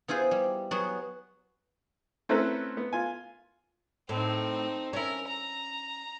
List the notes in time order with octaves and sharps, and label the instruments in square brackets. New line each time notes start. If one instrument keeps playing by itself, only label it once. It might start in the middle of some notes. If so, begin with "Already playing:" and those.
[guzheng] B3 E4 F4 G#4 C5
G3
F#3 B3 F#4 G#4
[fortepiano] A3 C4 C#4 E4 A#4 B4
B3
F4 G#5
[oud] A2 [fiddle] C4 D#4
[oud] C#4 E4 [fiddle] A#4
[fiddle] A#5